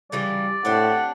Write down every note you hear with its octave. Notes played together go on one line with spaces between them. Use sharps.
C#3 E3 F#3 G3 D5
A2 C4 D4 G4 F#5